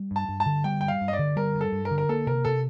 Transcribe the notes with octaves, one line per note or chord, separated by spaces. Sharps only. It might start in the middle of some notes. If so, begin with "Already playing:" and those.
Already playing: G3
G2 A5
G2
A5
D3
G3 G5
G2 G5
F5
G2
D#5
D5
D3
G3 A#4
G2
A4
G2
A#4
D3
A#4
A#3 A4
C3 A#4
C3 A4